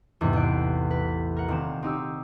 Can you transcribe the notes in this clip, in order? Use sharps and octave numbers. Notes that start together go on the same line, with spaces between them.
E2 G#2 C3 E3
A1 F#6 C7 D7
B4
A#4 F#5
D#1 C4 E7
C4 D#4 G4 E6